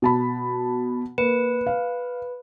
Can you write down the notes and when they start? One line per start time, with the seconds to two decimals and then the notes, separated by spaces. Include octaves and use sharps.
0.02 B2 A5 B5
1.18 A#3 B4
1.67 F5